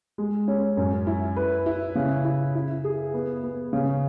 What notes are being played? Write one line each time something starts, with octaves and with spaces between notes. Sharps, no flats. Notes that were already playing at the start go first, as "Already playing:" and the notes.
G#3
C#4
F#2
E4
B4
E4
C#3
E4
E4
G#4
B3
B3
C#3